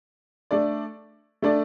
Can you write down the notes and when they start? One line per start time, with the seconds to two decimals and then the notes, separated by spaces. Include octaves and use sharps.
0.51 A3 D4 A4 D5
1.42 A3 D4 A4 D5